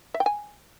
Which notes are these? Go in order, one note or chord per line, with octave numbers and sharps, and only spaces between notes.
E5
G5
G#5